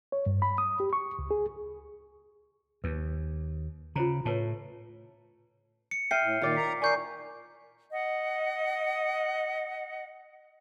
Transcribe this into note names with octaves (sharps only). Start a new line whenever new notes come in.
C#5
G2
B5
D#6
G4
C#6
C#2
G#4
D#2 B4
C#3 F4 C5 A#5
A2 B4 C#5 A5
C#7
E5 G5 F6 C7 D#7
A2
A#2 D#3 F4 D5
A#4 A#5 B6
A#4 D5 G#5 C#6 G6 C7
D#5 F#5